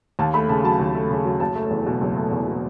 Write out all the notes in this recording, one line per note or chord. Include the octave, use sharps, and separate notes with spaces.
D#2 A5
A3 B5
C#3 A5
F#3 A5
D#2
A3
C#3
F#3
F#1 A5
A3
E2
B2
F#1
A3
E2
B2